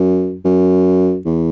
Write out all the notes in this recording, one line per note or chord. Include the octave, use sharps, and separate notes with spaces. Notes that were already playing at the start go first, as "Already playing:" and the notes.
Already playing: F#2
F#2
E2